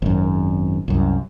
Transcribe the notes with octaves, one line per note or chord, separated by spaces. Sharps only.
G#1 F#2
C2 F#2